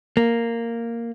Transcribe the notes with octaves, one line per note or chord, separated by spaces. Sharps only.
A#3